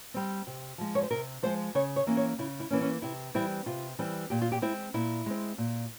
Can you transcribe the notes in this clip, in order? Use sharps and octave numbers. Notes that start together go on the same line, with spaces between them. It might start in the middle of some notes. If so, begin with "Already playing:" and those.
G3 C4
C3
F3 G#3
C#5
C5
C3 A#4
F3 G#3 C5
C#3 C#5
C#5
E3 A#3 C#4
C#5
C#3 E4
E4
E3 A#3 C#4
C#4
C3 E4
E3 G3 C4 E4
C3 F4
E3 G3 C4
A#2 G4
F4
G4
G#3 C4 E4
A#2 E4
G#3 C4
A#2